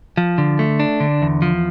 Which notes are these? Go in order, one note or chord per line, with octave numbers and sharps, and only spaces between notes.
F3
D3
A3
D4
D3
E2
F3